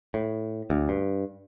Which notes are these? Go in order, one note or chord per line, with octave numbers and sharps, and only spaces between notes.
A2
D2
G2